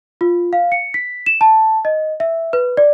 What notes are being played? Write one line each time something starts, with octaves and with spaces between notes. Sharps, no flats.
F4
F5
C#7
B6
E7
A5
D#5
E5
B4
D5